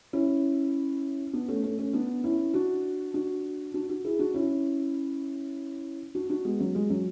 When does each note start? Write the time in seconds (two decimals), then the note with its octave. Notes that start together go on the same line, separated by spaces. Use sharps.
0.13 C#4 E4
1.33 B3 D4
1.48 A3 C#4
1.63 A3 C#4
1.79 A3 C#4
1.93 B3 D4
2.24 C#4 E4
2.54 D4 F#4
3.14 D4 F#4
3.74 D4 F#4
3.89 D4 F#4
4.04 E4 G#4
4.19 D4 F#4
4.34 C#4 E4
6.15 D4 F#4
6.30 D4 F#4
6.45 G#3 B3
6.60 F#3
6.75 G#3
6.90 F#3